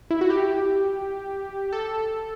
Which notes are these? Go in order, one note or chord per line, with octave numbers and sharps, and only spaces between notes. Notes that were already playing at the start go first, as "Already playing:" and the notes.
E4
F#4
G4
A4